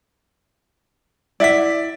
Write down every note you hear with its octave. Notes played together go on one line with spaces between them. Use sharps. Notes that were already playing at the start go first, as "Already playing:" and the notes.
E4 D5 E5 F#5 B6